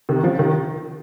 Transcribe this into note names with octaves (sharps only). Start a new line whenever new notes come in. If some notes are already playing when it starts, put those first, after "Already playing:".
C3 D#3
C#3 F3
C3 D#3